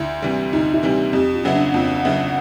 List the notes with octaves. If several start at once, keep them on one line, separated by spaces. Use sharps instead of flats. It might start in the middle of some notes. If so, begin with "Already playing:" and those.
Already playing: D2 E4
C3 E3 G3
D2 D#4
E4
C3 E3 G3
F2 G4
F4
C#3 F#3 B3 E4
D4
F2 F4
C#3 F#3 B3 E4